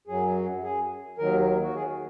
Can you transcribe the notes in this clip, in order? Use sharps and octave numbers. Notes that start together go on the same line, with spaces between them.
F#2 F#3 G#4
G#4
D#2 D#3 F#3 A#4
F#4
G#4